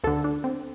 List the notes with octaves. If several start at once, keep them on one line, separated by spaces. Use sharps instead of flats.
D2 D3 A4
D4
C4